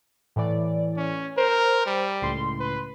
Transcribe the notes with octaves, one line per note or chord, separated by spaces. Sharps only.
A2 E3 D5
C#4
A#4 C5
G3
C#2 A2 C6
B4